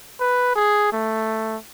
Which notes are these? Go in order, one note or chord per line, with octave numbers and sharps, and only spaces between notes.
B4
G#4
A3